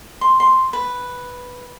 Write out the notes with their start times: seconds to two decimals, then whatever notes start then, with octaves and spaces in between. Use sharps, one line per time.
0.21 C6
0.40 C6
0.73 B4